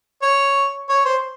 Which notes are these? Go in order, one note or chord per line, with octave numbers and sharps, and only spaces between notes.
C#5
C#5
C5